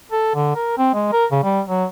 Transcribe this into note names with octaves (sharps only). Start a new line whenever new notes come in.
A4
D3
A#4
C4
G#3
A#4
C#3
G3
F#3